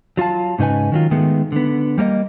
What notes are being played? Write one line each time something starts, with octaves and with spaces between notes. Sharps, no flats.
F#3 F4 F5 A5
G#2 C#3 D#4 B4 G#5
D#3 F#3 F4
D#3 G#3 A3 B3
D3 B3
G3 A#3 A#4 D#5